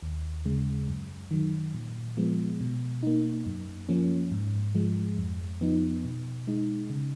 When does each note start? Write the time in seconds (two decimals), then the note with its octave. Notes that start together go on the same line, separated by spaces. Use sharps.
0.03 D#2
0.46 C#3 G#3
0.88 F#2
1.31 D#3 F#3
1.75 A#2
2.17 F3 G#3 B3
2.61 B2
3.03 A#3 D#4
3.46 F#2
3.89 F3 A#3 C#4
4.32 G#2
4.75 F3 G#3
5.18 F2
5.61 F3 B3 D#4
6.05 B2
6.47 G#3 D#4
6.90 C#3